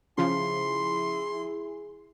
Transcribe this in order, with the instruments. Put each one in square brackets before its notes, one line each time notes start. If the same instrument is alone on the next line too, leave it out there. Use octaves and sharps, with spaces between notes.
[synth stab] C#3 F3 [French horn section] E4 G#4 [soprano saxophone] C6